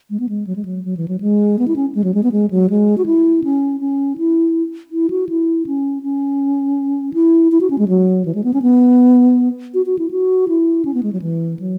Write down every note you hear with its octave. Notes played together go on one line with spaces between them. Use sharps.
G#3
B3
G#3
F#3
G#3
F#3
F#3
E3
F#3
G#3
B3
E4
C#4
G#3
F#3
G#3
B3
G#3
F#3
G#3
F#4
E4
C#4
C#4
E4
E4
F#4
E4
C#4
C#4
E4
E4
F#4
C#4
G#3
F#3
E3
G#3
B3
C#4
B3
F#4
F#4
E4
F#4
E4
C#4
B3
G#3
F#3
E3
F#3